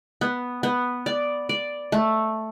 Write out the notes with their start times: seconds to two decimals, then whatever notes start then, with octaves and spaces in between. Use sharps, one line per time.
0.21 B3
0.63 B3
1.06 D5
1.49 D5
1.92 A3